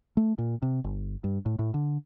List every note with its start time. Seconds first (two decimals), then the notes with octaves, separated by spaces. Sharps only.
0.17 A3
0.38 A#2
0.62 C3
0.84 G1
1.24 G2
1.46 A2
1.59 A2
1.74 D3